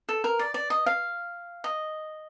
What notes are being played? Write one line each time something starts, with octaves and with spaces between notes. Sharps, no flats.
A4
A#4
D5
D5
D#5
F5
D#5